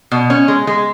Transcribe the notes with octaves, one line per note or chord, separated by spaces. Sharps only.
B2
C#4
G#3
G#3